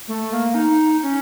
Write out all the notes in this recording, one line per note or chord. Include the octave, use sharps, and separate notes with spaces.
A3
A#3
D#4
C#4